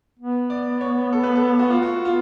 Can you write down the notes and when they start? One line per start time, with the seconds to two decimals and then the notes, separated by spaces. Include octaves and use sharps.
0.19 B3
0.50 D5
0.81 C#5
1.13 A4
1.24 B4
1.35 A4
1.59 F#4
1.70 F4
1.82 F#4
2.05 B3 F4